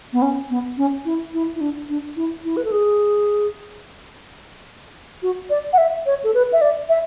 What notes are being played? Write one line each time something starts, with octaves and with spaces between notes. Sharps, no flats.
B3
C#4
B3
C#4
E4
E4
E4
D4
D4
E4
E4
B4
A4
G#4
F#4
D5
F#5
E5
C#5
A4
B4
E5
D5
E5